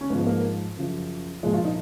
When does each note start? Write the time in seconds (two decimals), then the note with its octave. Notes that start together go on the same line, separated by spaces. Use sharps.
0.01 C#4
0.10 G#2 F3 B3
0.27 A#3
0.77 F#2 C#3 F3
1.43 F3 G#3
1.46 A#2
1.54 F4
1.65 D#4